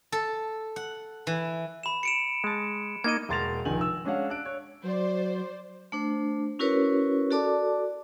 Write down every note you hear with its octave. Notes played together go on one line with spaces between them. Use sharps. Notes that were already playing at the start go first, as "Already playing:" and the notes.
A4
F#5
E3
B5 E7
C#7 D7 E7
G#3 A5
A#3 D#4 D#5 G#6 D#7
E1 A#4 C6 A6 A#6 F7
F1 A#1 D#3 G#5 F#7
E6
G#3 C#4 D4 C#5 F5 F#5
D4 F#6 D7
C#5
F#3 C5 D5
A3 D4 C5
C#4 E4 F#4 A#4 B4 C#5
F#4 A4 D5 A5 D6